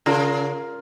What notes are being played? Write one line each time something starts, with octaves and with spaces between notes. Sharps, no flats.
C#3 F4 A#4